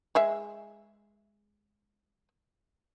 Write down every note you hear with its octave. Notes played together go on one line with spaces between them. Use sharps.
G#3 G#4 E5